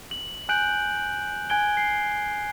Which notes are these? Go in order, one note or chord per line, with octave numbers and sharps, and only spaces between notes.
F#7
G#5 F#6 G6 D7 F#7
G#5 F#6 G#6 D7 G7
C7